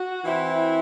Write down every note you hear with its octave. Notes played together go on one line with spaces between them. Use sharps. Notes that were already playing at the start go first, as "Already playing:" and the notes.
Already playing: F#4
E3 C4 E4